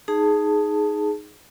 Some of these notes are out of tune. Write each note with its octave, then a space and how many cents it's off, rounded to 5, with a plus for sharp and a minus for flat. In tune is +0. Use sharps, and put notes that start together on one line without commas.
D#4 +0 G#4 +10 A5 +5